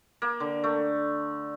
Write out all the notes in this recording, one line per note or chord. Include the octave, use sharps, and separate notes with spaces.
A#3
D3
A3